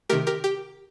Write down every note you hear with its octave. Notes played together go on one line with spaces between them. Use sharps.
C3 D#3 A3 G4 A#4
G4 A#4
G4